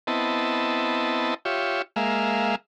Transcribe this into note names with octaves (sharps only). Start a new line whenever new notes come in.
B3 C4 E4 D#5 A5
F4 G4 C#5 E5
G#3 A#3 E5 F5